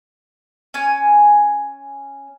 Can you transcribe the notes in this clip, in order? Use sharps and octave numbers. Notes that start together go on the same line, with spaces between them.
C#4 G#5